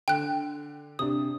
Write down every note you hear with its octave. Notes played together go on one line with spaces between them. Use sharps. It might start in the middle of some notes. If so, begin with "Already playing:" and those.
D3 G5 F#6
C3 D4 D#6